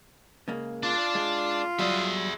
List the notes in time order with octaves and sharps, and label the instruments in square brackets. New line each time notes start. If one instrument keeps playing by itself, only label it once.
[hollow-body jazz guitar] C#3 G#3 A#3
[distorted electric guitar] D4 D5 [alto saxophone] F4
[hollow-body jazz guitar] G#3
[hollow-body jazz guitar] F#3 G3 [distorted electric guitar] G#4 E5